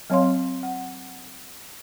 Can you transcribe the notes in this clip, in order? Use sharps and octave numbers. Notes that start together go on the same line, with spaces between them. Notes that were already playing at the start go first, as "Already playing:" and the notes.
F#3 C4 C#5 F5 C6
F#5